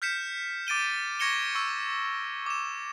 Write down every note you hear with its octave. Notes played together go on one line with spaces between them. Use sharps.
F6 G6 B6 C#7 E7
D6 A6 D7 D#7 G7
C#6 G#6 A#6 C#7 E7 G7
C#6 E6 C#7
D6 E7